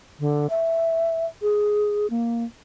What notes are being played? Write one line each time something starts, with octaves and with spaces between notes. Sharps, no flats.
D3
E5
G#4
A#3